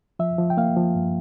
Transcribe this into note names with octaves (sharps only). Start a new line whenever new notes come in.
F3 E5
F3
G5
A#3 F5
F3
G2